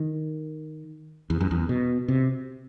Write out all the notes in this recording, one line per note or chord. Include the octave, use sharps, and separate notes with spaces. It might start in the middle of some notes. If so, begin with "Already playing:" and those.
Already playing: D#3
E2
F#2
E2
B2
C3